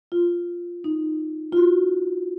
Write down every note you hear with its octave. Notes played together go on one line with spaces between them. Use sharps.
F4
D#4
F4
F#4